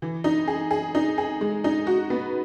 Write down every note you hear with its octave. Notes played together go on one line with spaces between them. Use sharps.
E3
D#4
G#4
G#4
D#4
G#4
G#3
D#4
F#4
B3